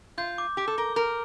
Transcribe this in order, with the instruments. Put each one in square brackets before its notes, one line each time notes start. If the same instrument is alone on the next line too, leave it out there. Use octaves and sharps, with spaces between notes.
[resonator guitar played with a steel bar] F4 [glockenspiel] G6
[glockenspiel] D6
[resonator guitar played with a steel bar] G4 [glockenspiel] D6
[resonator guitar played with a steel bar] A4
[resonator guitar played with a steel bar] A#4 [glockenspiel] G7
[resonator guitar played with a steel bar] A#4 [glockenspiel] F6